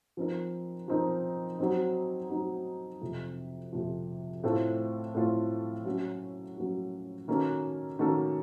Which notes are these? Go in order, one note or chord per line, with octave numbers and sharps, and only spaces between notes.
F3 C4 D#4 A#4
F3 C4 D#4 A#4
F#3 C4 D#4
F#3 C4 D#4
F2 C3 F3
F2 C3 F3
A2 A3 C4 F4 A4
A2 A3 C4 F4 A4
F#3 A#3 C#4 F#4
F#3 A#3 C#4 F#4
D#3 A#3 C#4 F#4 A4
D#3 A#3 C#4 F#4 A4